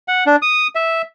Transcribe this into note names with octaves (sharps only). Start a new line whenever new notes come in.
F#5
D4
D#6
E5